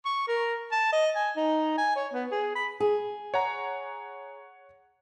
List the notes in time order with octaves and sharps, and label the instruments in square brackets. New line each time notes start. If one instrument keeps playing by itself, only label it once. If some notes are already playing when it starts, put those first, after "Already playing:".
[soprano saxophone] C#6
A#4
A5
D#5
G#5
D#4
G#5
C#5
B3
G#4
B5
[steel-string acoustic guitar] G#4
[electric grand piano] C#5 F#5 A#5